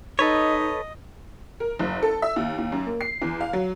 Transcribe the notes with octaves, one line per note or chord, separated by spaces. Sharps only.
D#4 A4 B4 C#5 D#5
A#4
F#1
A4
E5
D#2
D#2
F#2
A#3
C7
E2
F5
F#3